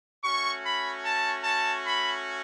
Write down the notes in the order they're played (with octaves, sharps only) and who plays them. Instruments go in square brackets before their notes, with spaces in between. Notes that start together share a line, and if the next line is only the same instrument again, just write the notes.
[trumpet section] A3 C#4 F#4 C#6
B5
A5
A5
B5